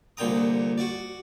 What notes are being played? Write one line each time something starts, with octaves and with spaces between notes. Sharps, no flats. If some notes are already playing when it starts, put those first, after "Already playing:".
C2 A#2 D3 G5 A#5 D#6
F#4 D5